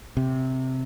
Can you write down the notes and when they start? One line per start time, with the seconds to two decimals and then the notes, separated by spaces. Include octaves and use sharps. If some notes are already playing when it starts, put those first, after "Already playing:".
0.17 C3